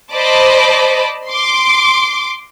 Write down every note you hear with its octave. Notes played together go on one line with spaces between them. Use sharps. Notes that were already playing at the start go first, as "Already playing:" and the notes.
C5 D5 D#5 A5 B5 D6
C6 D6